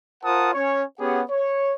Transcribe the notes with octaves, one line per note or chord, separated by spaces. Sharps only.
F4 A#4 C5 F#5 A5 D#6
C#4 C#5
B3 C#4 G4 G#4 C#5 F#5
C#5